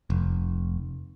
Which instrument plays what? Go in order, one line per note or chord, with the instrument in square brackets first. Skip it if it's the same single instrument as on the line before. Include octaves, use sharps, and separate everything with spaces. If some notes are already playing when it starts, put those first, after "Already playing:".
[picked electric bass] F1